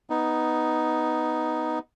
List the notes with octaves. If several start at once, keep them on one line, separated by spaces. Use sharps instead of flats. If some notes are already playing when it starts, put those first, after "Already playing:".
B3 D#4